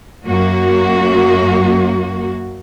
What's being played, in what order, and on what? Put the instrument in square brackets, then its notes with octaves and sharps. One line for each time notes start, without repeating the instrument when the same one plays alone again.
[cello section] F#2 A#3 F#4